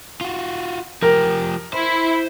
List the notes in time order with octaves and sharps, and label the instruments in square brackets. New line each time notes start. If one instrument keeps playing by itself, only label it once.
[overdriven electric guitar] F4 F#4
[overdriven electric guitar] F3 G4 [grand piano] A#4
[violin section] E4 [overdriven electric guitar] C5